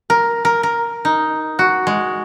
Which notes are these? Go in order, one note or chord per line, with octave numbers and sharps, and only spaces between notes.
A#4
A#4
A#4
D#4
F#4
G#3